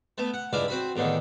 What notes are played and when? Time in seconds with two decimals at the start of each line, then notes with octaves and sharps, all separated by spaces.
0.18 A3 B3
0.34 F#5
0.53 C#2 G2 E4 D5 F5
0.68 C4 F#4 B5
0.96 E2 A2 D3 D#3